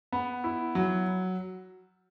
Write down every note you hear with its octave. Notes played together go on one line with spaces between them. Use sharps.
B3
E4
F#3